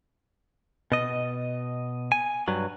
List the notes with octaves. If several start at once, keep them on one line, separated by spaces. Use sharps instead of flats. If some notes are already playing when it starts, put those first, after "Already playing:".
B2 D#5
G#5
G2 F#3